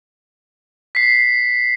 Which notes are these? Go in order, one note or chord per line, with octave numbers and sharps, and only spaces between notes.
B6 C7